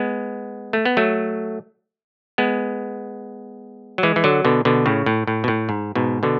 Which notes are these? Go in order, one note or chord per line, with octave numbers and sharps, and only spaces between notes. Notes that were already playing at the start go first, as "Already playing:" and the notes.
Already playing: G#3 B3
A3
B3
F#3 A3
G#3 B3
F#3
E3 G#3
E3
D3 F#3
B2 D3
B2 D3
A2 C#3
A2
A2
B2
A2
G#2
G#2 B2
B2 D3